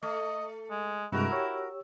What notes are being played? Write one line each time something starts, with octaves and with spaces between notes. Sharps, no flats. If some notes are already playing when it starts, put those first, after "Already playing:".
A3 D#5
G#3
G2 C3 G#3 E4 F#4 A#4
G4 C#5 E6